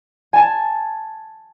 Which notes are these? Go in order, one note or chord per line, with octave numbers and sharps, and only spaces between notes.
G#5 A5